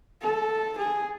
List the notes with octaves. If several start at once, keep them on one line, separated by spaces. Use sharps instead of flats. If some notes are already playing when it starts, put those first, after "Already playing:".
A4
G#4